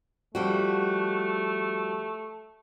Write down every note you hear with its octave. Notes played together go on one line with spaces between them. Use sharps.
F3 G3 A3 F#4